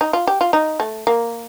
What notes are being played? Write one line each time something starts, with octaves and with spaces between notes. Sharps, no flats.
D#4
F4
G4
F4
D#4
A3
A#3